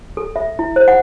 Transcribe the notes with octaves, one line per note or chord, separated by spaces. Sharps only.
A4
E5
E4
C5
F#5